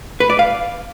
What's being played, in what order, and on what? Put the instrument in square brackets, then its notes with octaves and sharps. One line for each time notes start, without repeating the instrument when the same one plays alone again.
[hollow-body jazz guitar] B4
D5
F5